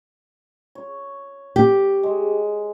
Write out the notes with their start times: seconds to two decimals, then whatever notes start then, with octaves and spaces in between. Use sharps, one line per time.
0.75 C#5
1.56 G4
2.03 G#3